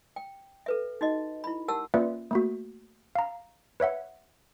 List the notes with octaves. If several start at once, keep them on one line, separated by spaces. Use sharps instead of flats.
G5
A4 B4 E5
D#4 F#4 D#5
E4 B5
G4 A#4 F#5 A5 E6
A#3 C#4 F4 B4 D5 E5
A3 A#3 F#4
F5 A#5
B4 C#5 E5 F#5